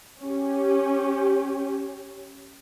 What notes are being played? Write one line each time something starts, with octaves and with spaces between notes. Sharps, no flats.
C#4 G4